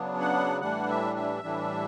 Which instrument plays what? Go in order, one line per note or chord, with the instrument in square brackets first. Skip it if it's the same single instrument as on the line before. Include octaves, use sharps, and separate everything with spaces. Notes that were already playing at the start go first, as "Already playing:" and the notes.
Already playing: [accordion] C#3 F#3 B3 D4
F#5
A2 E3 G3 D4 F#5
E5
E5
A2 E3 G3 D4